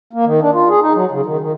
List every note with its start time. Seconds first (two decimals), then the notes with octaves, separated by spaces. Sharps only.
0.13 A#3
0.25 D#3
0.42 D4
0.54 F4
0.69 G#4
0.83 D#4
0.95 F#3
1.11 C#3
1.26 D#3
1.41 D#3